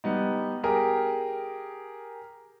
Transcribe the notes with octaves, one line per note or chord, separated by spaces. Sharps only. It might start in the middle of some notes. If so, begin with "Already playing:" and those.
G3 B3 D#4
G4 G#4 A#4